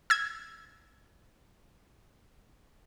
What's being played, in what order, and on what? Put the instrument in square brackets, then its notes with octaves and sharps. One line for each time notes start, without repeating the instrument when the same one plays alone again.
[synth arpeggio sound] E6 G#6